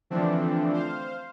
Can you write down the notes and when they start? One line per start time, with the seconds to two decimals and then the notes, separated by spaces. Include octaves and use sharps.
0.10 D3 E3 F3 A3 C4 D4
0.73 C5 F5